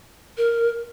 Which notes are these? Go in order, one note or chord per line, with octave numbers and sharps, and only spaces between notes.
A#4